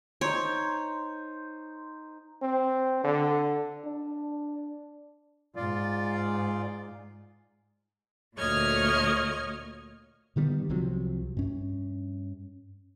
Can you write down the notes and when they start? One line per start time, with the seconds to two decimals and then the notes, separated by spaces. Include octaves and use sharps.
0.21 D#4 C5 C#5
2.42 C4
3.04 D3
3.86 D4
5.56 G#2 F4 D5
8.36 D2 A#2 C#5 D#5 F6 G#6
10.36 D3 D#3 G3 B3
10.70 C2 C3 F3 F#3
11.37 G2 C#4